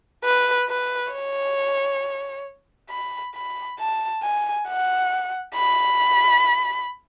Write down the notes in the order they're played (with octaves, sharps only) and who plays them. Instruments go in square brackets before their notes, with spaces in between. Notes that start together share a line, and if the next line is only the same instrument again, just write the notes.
[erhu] B4
B4
C#5
B5
B5
A5
G#5
F#5
B5